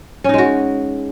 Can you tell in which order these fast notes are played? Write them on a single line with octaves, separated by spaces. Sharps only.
C#4 D#4 G#3 F#4